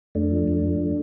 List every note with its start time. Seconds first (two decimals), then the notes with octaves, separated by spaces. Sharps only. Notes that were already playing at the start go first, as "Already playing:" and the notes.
0.15 F2 A3 D4
0.31 F3
0.48 F2
0.64 F3